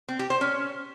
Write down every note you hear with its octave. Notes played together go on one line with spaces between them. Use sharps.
C4
G4
C5
C#4